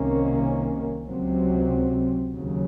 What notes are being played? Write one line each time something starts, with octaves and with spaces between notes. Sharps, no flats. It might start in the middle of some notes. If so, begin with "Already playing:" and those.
Already playing: C2 C3 D#3 A#3 C#4
C#2 C3 F#3 C4
D#2 C#3 F#3